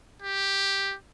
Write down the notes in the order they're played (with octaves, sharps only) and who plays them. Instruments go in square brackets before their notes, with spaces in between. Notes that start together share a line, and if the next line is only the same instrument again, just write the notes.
[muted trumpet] G4